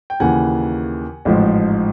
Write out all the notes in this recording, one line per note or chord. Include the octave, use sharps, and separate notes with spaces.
G5
D#2 C#3 E3 F#5 G#5
A1 G#2 F3